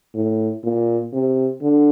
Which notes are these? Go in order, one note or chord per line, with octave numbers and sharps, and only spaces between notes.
A2
A#2
C3
D3